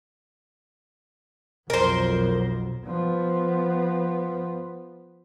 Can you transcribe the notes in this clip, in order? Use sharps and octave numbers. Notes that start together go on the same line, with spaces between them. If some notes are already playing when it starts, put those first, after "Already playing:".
B1 F2 A#4 C5
F3 B3